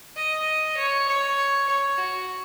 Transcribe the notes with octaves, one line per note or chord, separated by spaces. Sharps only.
D#5
C#5
C#5
C#5
F#4